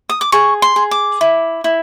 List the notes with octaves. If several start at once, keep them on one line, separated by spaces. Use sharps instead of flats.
D#6
D6
G#4 C#6
C6
G#4
D6
E4
E4